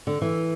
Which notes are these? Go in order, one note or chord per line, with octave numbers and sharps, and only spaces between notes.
D3
E3